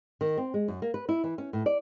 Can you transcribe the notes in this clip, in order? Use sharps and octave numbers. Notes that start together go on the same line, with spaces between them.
D#3
C4
G#3
F#2
A#3
B4
E4
E3
C#4
A2
D5